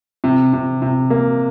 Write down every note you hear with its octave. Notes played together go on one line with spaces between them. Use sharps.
C3
C3
C3
A#3